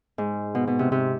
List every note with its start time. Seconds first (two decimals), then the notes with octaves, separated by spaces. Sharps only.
0.18 G#2
0.55 B2
0.67 B2
0.79 C3
0.92 C3